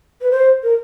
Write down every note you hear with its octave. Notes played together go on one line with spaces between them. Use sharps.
B4
C5
A#4